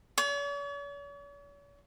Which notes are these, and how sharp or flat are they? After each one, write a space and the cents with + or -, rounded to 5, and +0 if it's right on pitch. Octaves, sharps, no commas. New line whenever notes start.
C#5 +45